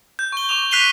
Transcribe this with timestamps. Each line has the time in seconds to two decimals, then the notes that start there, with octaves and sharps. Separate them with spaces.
0.19 G6
0.32 C#6 G7
0.49 C#6 D6 F7
0.71 F#6 B6 C7 D#7 F7 G7